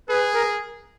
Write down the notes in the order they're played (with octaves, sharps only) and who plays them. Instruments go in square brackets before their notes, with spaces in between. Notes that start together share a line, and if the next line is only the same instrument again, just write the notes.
[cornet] G#4 [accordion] B4
[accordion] A#4